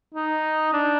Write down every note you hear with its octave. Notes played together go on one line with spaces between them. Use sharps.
D#4
D4